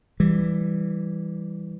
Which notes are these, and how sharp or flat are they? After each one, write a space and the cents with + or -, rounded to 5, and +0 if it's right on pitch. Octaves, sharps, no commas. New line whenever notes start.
E3 +0 G3 +0